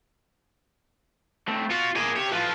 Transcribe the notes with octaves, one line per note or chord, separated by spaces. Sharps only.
A3 C4
B3 F4 F#4
A#3 G#4 A#4 G#5
G4 C#5 E5
A2 F3 F4 B4